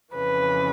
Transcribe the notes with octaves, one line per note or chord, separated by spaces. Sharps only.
F2 C#3 E3 B4